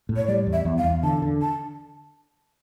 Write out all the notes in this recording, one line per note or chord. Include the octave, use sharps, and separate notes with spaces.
A2
C#5
G3 D5
E2
E5
E2
F5
E2
D3 A5
D3
A5